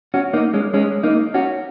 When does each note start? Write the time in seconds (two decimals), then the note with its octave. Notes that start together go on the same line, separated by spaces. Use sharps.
0.14 C#4 F#4
0.33 A#3 D#4
0.54 G#3 C#4
0.74 G#3 C#4
1.03 A#3 D#4
1.34 C#4 F#4